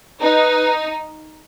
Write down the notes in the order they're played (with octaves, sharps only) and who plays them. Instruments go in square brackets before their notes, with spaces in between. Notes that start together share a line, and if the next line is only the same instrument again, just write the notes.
[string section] D#4 [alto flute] B4